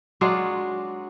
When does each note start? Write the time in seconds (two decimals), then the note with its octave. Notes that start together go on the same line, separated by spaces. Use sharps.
0.21 F#3 G#3 D4 F4